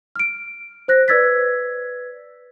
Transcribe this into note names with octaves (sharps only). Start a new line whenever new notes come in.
F6 D7
C5 F#6 A#6
B4 D5 E6 G#6 A6 B6